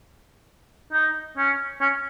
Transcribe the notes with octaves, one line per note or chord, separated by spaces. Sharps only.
D#4
C#4
C#4